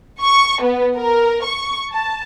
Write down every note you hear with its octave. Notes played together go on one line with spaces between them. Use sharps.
C#6
B3
A#4
C#6
A5